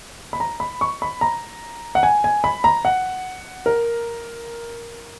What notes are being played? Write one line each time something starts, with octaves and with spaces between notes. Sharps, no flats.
B5
A#5
B5
C#6
B5
A#5
F#5
G#5
G#5
B5
A#5
F#5
A#4